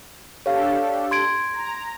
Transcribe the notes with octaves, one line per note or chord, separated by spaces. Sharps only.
D4 G4 A4 C#5 F5
C6 G#6 D7
A#5